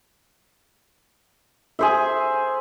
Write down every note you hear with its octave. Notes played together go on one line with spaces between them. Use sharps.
G#4 C5 E5